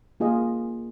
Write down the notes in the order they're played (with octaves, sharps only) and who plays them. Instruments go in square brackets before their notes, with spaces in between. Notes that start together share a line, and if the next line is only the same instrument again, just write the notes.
[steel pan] A#3 F4 G#4 D#5